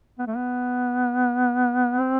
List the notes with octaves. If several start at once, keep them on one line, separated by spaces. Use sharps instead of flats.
B3
A3
B3
C4